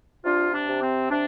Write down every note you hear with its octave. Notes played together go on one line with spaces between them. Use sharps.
C3 D4 F4
D4
C3
C4
C3 D4